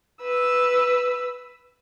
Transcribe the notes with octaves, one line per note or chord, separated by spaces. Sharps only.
B4 E6